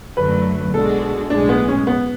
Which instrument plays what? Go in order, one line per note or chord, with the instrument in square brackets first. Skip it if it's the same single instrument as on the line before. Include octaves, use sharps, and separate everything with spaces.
[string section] F#2 D3 F#3 A3 [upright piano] B4
[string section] B1 B2 G#3 D4 F#4 [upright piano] A4
[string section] B1 A2 G#3 [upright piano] D4
[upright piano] B3
C#4
B3